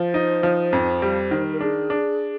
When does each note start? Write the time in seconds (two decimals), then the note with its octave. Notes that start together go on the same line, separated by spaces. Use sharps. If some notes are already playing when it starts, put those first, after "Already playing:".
Already playing: F3 C5
0.14 D#4
0.43 F3
0.73 F2
1.02 G3
1.31 D#3
1.52 A#4
1.60 D4 G#4
1.90 D4